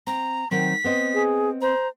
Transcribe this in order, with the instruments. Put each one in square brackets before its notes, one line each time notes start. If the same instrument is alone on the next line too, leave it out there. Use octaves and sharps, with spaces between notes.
[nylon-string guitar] C4 [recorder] A#5
[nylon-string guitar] D#3 F#3 C4 [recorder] B6
[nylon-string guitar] B3 C4 D#5
[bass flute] G#4
[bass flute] C5 [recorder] A#5